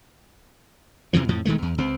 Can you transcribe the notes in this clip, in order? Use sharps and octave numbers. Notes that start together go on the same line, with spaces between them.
E2 C3 E3 F3
F2 A2 F3
E1 D#3 G#3 A3
E2
C#2 C4